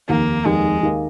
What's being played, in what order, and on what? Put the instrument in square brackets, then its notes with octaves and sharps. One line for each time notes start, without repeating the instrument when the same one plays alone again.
[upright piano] F1 D#2 D#3 [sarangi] A#3
[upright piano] F1 D#2 D#3 [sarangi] G#3
[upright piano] D#2 D#3 A#3 D#4